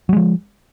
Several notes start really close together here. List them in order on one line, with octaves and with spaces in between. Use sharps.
F#3 G#3 F3